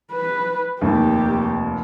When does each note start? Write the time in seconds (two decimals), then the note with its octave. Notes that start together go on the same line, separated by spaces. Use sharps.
0.12 B4
0.81 F1 D#2 G4